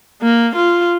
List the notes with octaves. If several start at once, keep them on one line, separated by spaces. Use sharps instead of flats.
A#3
F4